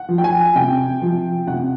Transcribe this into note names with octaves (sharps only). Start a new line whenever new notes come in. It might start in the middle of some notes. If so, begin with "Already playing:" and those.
Already playing: F#5
F3
G5
G#5
C3 G5
F3
C3 F#5